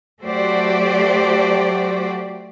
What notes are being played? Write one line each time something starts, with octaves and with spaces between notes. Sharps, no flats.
F#3 A3 F#4 G4 C5 D5